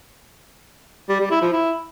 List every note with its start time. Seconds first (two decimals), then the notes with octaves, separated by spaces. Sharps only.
1.09 G3
1.20 G3
1.31 E4
1.42 F3
1.53 E4